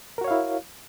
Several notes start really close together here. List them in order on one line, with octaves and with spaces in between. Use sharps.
A#4 F#4 C#5 F5 E4